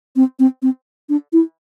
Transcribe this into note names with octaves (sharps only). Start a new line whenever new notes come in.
C4
C4
C4
D4
E4